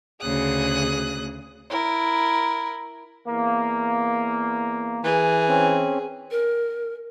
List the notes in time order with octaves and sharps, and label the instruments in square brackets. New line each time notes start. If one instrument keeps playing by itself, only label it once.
[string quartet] D2 C#3 G#4 D#6 F#6
[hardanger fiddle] E4 A#4
[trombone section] E2 A#3
[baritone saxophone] E3 [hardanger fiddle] G#4
[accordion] C4 C#4
[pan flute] A#4